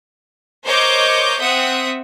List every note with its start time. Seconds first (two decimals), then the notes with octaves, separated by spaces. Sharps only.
0.64 A#4 C5 C#5 D#5 D6 G6
1.39 C4 E5 F#5 D#6